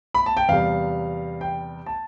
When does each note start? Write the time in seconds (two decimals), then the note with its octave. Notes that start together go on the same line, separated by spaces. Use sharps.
0.15 B5
0.26 A5
0.37 G5
0.49 E2 C3 G3 F5
1.41 G5
1.86 A5